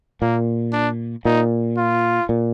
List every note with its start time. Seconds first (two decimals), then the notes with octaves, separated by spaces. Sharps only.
0.22 A#2 A#3
0.73 D4
1.25 A#2 D#4
1.77 F4
2.29 A#2